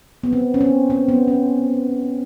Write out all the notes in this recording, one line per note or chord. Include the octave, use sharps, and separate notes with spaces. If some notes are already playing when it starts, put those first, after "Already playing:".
B3
C4
C#4
C4
C4
B3
C#4